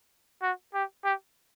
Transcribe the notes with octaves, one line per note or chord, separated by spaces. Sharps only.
F#4
G4
G4